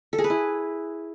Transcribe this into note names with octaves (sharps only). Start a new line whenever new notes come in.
A4
G#4
B4
E4